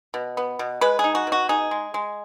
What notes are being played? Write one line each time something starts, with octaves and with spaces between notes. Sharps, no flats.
B2
B3
B2
G#3 B4
G#4
D#4
F#4
B2
F#4
D#4 G#4
G#3
G#3